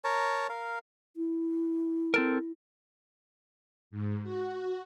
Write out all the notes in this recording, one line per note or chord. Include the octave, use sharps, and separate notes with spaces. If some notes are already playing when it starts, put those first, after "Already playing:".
A#4 C#5 A5 A#5
A#4 F5
E4
C4 A4 A#4
G#2
F#4